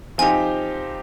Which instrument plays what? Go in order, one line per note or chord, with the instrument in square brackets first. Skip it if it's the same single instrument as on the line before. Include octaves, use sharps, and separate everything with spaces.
[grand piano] F3 C4 D#4 G4 [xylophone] G#5